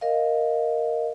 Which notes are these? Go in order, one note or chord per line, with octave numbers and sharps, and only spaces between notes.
A#4 D#5 F5